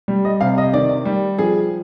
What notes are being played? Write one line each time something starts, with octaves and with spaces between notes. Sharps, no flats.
G3
D#5
C3 F5
D#5
D#3 D5
G3
F3 G#4